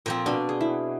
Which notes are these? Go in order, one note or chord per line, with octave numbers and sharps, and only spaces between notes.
A#2 F3 C4
B2 D4
G#4
E4